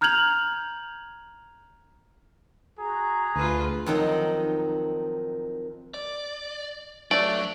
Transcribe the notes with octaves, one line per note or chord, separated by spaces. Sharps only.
A#5 F6 G6 G#6 F7 F#7
F#4 G#4 A#5
D2 F4 B4
F2 D#3 F#3 D#4
D5
F#3 A3 D4 D5